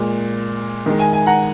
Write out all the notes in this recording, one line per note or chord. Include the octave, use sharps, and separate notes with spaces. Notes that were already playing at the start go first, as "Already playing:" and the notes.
Already playing: A#2 G#3
D#3 G#3
G#5
G#5
F#5 A#5